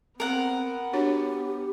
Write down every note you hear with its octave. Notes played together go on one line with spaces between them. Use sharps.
B3 C4 A#4 F#5
D4 F#4 G4 C#5